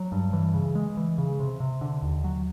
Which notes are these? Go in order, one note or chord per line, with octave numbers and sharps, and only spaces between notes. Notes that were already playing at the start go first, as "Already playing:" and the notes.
Already playing: F#3
G2
E3
C#3
G#3
E3
C#3
C3
C3
D3
D#2
F#3